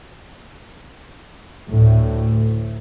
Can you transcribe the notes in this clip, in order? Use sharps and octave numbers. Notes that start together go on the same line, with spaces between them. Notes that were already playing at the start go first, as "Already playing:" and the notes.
D2 A2